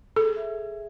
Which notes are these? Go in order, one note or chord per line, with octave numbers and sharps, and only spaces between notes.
G#4 A4
E5